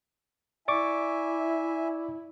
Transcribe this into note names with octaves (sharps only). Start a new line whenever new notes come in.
E4 D5 E5 G#5 C#6 D6